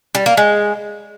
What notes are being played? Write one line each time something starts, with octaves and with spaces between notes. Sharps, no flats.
G3
A#3
G#3